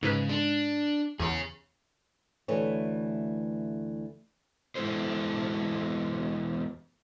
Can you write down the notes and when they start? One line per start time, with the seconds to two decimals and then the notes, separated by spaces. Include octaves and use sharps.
0.03 G#2 C#3 B4
0.29 D4
1.20 E2 G#4 C#5
2.48 D2 E3 A3 B4 C#5
4.75 E2 G#3 E4 A4 C5